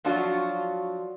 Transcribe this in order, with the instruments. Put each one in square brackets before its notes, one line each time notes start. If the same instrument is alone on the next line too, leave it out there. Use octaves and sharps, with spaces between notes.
[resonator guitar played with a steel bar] F3 F#3 D4 F4 F#4